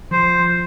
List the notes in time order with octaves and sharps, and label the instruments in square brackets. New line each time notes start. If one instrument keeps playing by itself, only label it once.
[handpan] F3 [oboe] C5